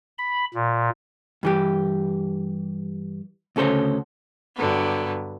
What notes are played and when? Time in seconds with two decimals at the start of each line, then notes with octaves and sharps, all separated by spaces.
0.18 B5
0.54 A#2
1.43 G2 E3 G4
3.56 D2 C#3 A4 C5 C#5
4.56 G2 D3 F#3 B3